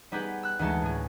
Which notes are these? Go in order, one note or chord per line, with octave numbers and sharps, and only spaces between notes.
G3 B3 D#4 G4 G#4 B4
E6 F#6
D2 E3 G#3 D#4 A5 C#7
A2 G#4